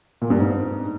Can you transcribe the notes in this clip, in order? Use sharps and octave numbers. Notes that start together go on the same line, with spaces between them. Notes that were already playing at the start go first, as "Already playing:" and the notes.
A#2
G2
G#2